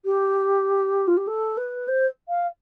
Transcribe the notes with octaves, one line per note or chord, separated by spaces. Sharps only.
G4
F4
G4
A4
B4
C5
F5